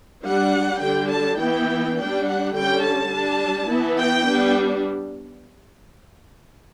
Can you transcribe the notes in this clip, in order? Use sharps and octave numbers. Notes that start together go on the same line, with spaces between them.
G3 D4 F#5
D3 G3 D4 G5
A5
E3 B3 E4 G5
G3 D4 G5
F#5
D3 G3 C#4 G5
A5
G3 D4
E3 B3 E4
G5
G3 B3 D4